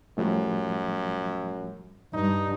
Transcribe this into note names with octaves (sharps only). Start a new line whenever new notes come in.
F#2 A2 F3 G3
G2 D#4